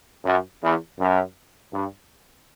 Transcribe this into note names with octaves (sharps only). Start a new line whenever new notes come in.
F#2
E2
F#2
G2